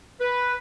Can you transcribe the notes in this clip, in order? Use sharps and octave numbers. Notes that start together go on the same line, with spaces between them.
B4